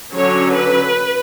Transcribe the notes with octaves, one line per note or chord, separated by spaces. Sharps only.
D3 F#3 C#4 C#5
B4